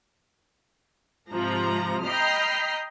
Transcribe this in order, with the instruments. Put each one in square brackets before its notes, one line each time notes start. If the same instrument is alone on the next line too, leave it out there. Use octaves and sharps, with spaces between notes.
[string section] G#2 C3 F3 A#5
D#5 G5 A#5 B5 F6 C7